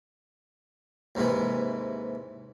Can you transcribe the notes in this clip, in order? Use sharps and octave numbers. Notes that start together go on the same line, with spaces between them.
D#2 G#2 C3 E3